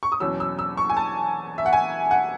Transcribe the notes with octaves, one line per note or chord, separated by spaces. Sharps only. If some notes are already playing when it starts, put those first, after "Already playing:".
C#6
D#6
E2 B2 F#3 C#4 E6
E6
E6
C#6
G#5
A5
E5
F#5
G#5
F#5